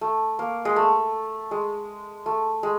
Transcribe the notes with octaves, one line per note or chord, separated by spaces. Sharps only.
A3
A#3
G#3
A3
G#3
A3
G#3